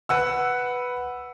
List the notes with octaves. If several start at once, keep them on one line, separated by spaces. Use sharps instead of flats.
B4 F#5 E6